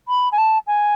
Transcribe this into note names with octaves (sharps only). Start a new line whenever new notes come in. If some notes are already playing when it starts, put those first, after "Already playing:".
B5
G#5
A5
G#5